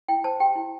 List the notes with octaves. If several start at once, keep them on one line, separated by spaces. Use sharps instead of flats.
E4 G5
C5 A5
G4 G5
E4